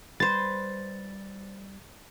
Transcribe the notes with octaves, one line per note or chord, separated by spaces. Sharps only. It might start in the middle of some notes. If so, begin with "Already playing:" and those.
G3 B4 C5 A6